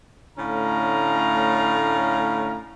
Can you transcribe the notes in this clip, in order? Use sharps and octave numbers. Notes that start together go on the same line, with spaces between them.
A2 D3 A3 C#4 F5 A#5